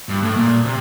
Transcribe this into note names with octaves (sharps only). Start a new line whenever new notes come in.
G2
A2
A#2
C3